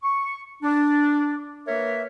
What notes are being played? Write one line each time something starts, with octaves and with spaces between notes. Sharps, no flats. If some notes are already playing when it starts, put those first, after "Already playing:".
C#6
D4
A#3 A#4 B4 C#5 E5